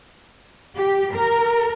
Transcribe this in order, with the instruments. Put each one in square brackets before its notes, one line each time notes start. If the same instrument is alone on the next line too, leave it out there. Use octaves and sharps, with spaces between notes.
[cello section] G4
A#4